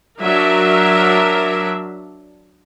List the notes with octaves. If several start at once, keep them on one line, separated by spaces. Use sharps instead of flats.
F#3 D4 A#4 E5